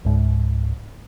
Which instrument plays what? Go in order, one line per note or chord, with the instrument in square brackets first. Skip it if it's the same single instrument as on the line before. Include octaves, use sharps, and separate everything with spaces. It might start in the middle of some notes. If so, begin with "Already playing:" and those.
[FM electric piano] C#2 G#2